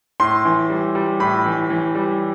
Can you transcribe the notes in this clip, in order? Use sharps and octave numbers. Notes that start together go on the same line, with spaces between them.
A2 C6
E3
G3
G3
A2 B5
E3
E3
G3